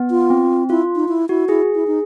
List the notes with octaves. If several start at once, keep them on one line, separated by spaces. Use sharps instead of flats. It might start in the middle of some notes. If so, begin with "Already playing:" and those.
Already playing: B3
F4
C4
E4 F4
D#4
E4
E4 F#4
E4 G#4
E4
D#4